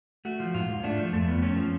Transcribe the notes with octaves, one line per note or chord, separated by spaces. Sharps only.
A3 F#4
F3
G#2 F4
G#2
A3 D4
F3
F2 A3
F2 B3
A3 C#4
F3